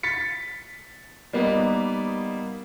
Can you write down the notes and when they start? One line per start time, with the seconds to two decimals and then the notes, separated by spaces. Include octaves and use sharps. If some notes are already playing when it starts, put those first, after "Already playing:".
0.03 A6 B6 C#7
1.33 G3 A#3 B3 D#4